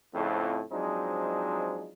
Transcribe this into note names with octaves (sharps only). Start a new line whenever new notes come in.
F2 A2 C#3
F3 F#3 G#3 C4 D4 D#4